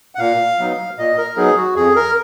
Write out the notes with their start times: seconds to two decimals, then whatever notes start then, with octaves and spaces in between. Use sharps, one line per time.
0.15 F#5
0.19 A#2 F5
0.59 F#3 B3 D#4
0.98 A#2 D#5
1.18 A#4
1.37 F#3 B3 D#4 G#4
1.57 F#4
1.76 F2 G#4
1.96 A#4